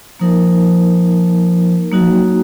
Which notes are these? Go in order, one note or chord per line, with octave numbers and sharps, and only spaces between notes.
F3 A#3 D#4 A#4
F#3 A#3 D#4 F#4
F3
F#3